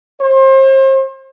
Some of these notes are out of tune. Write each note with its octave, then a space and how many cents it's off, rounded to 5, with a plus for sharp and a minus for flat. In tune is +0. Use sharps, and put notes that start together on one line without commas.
C5 +35